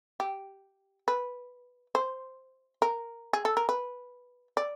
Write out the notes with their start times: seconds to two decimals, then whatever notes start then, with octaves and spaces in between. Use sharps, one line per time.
0.20 G4
1.08 B4
1.95 C5
2.82 A#4
3.33 G#4
3.45 A4
3.57 A#4
3.69 B4
4.57 D5